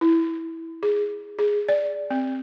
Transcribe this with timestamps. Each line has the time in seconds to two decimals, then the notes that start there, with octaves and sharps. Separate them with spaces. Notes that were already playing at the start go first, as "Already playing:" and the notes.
0.01 E4
0.83 G#4
1.39 G#4
1.69 D5
2.10 C4